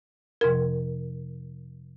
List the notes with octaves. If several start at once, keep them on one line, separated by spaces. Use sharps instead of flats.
F2 C3 F3 A#4